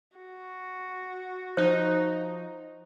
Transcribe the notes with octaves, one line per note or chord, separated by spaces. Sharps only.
F#4
F3 D#4 C5